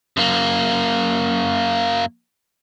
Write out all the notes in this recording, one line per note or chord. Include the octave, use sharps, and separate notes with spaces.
F#2 A#3